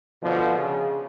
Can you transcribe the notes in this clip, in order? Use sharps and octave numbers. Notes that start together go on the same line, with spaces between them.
B2 D3 F3
C#3